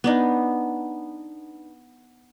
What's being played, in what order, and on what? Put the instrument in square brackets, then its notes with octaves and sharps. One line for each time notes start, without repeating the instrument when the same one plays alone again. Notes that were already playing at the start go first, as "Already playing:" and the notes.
[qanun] B3 D4 D#4